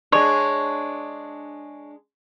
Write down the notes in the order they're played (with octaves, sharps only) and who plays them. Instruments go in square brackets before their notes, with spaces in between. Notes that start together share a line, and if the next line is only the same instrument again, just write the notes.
[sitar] G#3 D4 [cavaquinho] C#5